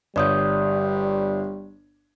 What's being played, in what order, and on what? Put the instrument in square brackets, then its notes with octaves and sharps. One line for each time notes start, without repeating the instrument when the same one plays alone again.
[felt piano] G1 C#5 [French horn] G3 [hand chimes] D5 D#6 G6